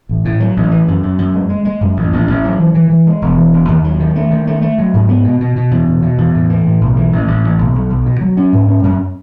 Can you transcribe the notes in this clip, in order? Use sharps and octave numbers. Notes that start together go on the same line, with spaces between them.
A1
A2
F#3
A1
E3
F#2
F#2
F#2
G#3
G#3
G#3
F#2
A1
A1
A1
F#3
E3
E3
E3
G#3
E1
E3
E1
D#2
F#3
D#3
A3
D#3
A3
A3
F#3
G#2
B3
B2
B2
B2
E2
B2
B2
E2
A2
E3
A2
B1
E3
A1
A1
A1
B1
B1
B1
B2
F#3
C#4
G#2
C#4
F#2